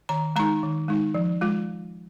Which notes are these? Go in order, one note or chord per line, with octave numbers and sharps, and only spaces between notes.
D#3 A#5
G#3 D#4 A#5
D#3
G#3 D#4
F3
G#3 F4